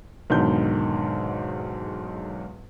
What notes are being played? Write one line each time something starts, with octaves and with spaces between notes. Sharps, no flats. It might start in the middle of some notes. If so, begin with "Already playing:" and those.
B1 E2 G#2 D3 D#3 G6